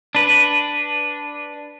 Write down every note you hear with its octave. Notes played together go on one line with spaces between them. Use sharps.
D4 B4